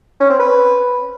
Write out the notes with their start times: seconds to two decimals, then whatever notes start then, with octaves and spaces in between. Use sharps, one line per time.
0.20 C#4
0.30 C4
0.39 B4